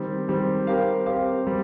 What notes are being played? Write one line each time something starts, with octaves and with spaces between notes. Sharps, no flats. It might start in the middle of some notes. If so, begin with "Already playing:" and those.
Already playing: D#3 G3 C4
D#3 G3 C4
C4 G4 A#4 F5
C4 G4 A#4 F5
G3 C4